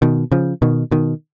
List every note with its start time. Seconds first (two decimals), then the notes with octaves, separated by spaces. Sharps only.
0.02 B2 D#3
0.32 C#3 F3
0.62 B2 D#3
0.91 B2 D#3